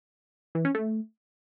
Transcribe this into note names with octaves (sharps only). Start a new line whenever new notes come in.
E3
C#4
A3